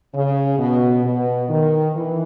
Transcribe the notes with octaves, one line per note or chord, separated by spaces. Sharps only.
C#3
B2
B2
D#3
E3